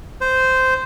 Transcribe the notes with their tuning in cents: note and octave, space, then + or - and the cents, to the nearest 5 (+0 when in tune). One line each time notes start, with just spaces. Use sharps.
C5 -10